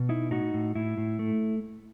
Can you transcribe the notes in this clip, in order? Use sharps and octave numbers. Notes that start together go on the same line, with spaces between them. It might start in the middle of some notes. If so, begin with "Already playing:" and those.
Already playing: B2
D#4 E4
A2 D#4 F#4
A2
A2 E4
A2
A3